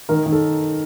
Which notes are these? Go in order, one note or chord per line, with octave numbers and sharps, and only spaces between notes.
D#3 A#4
D#3
A4